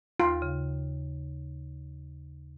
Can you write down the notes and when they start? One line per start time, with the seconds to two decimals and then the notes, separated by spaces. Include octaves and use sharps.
0.20 D#2 F4
0.42 C#3